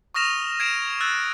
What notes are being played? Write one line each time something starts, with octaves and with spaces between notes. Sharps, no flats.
C#6 D#6 F6 A#6 E7 F7
G#6 C7 D7 E7
E6 F#6 A6